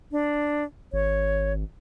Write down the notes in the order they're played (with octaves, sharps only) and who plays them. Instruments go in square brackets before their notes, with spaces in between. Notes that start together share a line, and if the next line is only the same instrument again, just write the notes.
[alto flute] D4
[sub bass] G#1 [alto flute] C#5